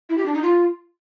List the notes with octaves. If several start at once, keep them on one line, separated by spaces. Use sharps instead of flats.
E4
G4
D4
D#4
F4